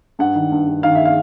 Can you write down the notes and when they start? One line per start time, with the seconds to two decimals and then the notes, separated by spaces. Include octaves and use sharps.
0.19 G2 F#5
0.35 D#3
0.52 G2
0.67 G2
0.83 D#3 F5
0.95 E5
1.05 F5